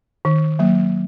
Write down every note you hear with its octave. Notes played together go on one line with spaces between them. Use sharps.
D#3
F#3 A#3